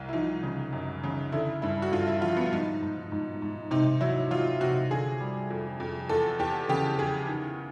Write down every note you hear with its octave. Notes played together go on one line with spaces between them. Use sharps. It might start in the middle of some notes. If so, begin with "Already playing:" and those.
Already playing: C2
E4
F3 D#4
C#3
F#2
C#3
D3 E4
G2 E4
F#4
G2 F4
E4
F3 F4
B3
G#2 D#4
G#2
G#2
G#2
C3 D#4
F#3 E4
F#3 F4
C3 F#4
D3 G#4
G3
F2
F2
E2 A4
E2 G4
C#3 G4
E2 G#4
D#3